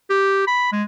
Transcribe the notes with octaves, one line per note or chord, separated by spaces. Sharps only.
G4
B5
G#3